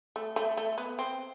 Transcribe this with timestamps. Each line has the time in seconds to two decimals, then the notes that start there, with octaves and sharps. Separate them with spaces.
0.16 A3
0.36 A3
0.57 A3
0.78 B3
0.99 C4